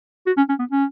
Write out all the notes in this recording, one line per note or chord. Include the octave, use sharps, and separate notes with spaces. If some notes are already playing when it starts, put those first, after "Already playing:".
F#4
C#4
C#4
B3
C#4